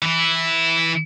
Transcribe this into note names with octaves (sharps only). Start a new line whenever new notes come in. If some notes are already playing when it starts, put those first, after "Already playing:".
E3 E4